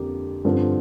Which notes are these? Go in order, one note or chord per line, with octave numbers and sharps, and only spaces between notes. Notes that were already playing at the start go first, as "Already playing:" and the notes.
Already playing: F2 D3 A#3 G4
G2 D3 F3 C4